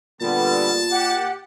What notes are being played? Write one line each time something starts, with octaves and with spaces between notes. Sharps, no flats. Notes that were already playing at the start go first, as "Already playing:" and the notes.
A#2 D3 G3 B3 A5
G4 F#5